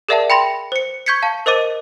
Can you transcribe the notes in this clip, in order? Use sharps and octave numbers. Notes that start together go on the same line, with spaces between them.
G#4 A#4 D5 E5 F#5 A5
G5 B5 C6 A#6
C5 C#7
C#6 G6 G#6 B6 C#7
F5 A5
A#4 C5 D#5 D6 D#7